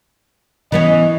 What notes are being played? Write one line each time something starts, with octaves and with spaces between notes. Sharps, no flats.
E3 B3 C#4 D#5